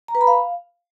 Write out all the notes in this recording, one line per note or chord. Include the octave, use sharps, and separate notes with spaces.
A#5
B4
B5
F5